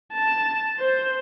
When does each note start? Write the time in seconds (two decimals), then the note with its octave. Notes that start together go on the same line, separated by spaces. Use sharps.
0.14 A5
0.79 C5